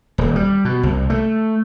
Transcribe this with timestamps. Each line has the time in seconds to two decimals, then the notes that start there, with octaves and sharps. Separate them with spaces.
0.18 D#1
0.36 G3
0.65 B2
0.83 C2
1.10 A3